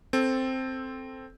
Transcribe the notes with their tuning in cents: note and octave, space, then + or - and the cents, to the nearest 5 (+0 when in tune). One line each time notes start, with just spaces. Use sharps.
C4 +0 A4 +0